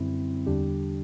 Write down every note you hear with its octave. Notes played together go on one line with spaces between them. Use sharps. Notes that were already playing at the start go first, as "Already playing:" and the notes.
Already playing: F#2 D3 G3 C4 E4
E2 D3 G3 D4 G4